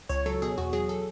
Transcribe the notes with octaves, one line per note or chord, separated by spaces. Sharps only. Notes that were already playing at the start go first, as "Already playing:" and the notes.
C#2 C#5
F#3 A4
B2 G#4
E2 F#4
F#3 G#4
A4